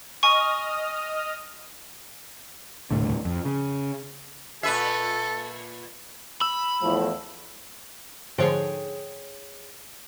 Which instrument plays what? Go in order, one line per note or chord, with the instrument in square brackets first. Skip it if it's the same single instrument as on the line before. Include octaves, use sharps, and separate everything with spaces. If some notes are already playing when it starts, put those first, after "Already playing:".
[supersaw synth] D#5 D#6 F6 [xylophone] G#5 C#6
[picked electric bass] D#1 C2 A2 D3
F2
C#3
[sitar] A#2 B4 E5 [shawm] A4
[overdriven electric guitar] B5 [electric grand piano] E6
[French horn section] E2 A2 F3
[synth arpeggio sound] G#2 D3 F3 [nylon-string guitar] G#4 C#5 G5